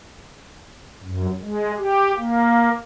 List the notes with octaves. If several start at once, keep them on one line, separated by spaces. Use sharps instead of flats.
F#2
G#3
G4
A#3